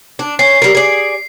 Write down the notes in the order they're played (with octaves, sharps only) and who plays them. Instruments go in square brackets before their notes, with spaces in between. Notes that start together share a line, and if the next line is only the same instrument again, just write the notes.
[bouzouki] D4
[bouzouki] C#4 [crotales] C7
[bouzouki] G3 A#4
G#4 D5